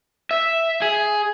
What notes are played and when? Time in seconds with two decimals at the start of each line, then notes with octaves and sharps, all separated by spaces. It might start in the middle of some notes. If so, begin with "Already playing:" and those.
0.31 E5
0.82 G#4